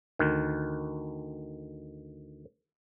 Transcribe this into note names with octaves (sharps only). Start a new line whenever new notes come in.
D2 D#3